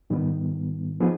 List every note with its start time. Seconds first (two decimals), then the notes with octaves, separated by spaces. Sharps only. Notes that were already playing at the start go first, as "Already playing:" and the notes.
0.10 G#2 D#3 G3 B3
1.00 F3 B3 D#4 G#4